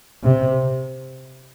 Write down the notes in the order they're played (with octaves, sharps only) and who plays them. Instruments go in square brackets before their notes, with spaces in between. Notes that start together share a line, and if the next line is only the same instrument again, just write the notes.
[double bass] C3